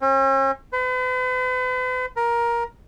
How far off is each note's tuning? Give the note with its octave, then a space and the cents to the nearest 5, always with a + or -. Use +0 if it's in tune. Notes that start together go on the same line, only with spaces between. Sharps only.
C#4 -45
B4 +45
A#4 +15